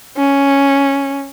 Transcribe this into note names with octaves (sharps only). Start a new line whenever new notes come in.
C#4